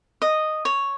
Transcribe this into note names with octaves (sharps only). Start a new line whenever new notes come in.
D#5
C#5